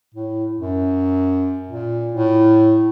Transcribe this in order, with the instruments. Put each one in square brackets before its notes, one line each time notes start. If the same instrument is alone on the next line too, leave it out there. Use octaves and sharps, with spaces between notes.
[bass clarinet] A2
F#2
A#2
A2